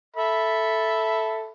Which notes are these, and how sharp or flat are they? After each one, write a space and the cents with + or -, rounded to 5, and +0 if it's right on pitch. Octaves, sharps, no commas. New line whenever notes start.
A4 +0 E5 +0 B5 +0